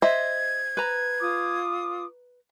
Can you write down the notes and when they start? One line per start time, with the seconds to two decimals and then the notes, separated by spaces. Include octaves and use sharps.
0.02 C5 D#5 E5 G#6
0.77 B4 A#5
1.21 F4 D6 D#6